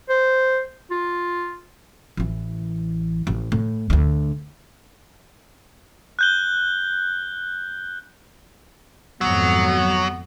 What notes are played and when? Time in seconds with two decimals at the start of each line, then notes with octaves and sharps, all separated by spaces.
0.09 C5
0.91 F4
2.17 A1 E3
3.27 A1
3.52 A2
3.90 D2 D3
6.19 F#6 G6 G7
9.21 G#1 F2 F#3 B3